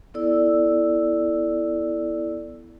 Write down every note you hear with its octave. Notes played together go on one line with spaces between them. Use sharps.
B3 E4 A4 D5 E6